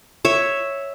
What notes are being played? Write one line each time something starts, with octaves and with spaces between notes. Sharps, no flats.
C#5 E5